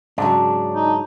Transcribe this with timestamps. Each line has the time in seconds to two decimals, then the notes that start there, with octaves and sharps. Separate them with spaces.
0.18 G#2 C#3 F#3 D4
0.75 D#4